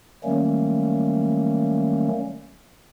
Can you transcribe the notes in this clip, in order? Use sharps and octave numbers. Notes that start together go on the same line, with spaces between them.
D#3 F#3 G3 A3 A#3 C#4